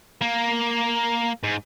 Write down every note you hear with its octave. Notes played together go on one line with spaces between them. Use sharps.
A#3
G#2